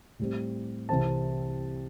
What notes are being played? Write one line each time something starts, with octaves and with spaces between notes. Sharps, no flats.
A2 G3 C4
C2 C3 E3 C4 A5